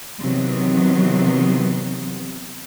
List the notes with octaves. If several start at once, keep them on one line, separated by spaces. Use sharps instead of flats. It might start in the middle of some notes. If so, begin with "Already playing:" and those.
C3 D#3 E3 F#3 B3